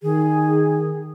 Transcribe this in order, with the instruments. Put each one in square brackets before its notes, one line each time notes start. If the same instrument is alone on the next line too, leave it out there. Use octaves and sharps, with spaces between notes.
[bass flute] D#3 [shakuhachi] G#4